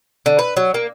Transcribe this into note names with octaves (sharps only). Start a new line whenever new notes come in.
D3
B4
F#3
A#3